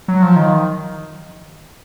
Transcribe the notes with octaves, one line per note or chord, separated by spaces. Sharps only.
F#3
F3
D#3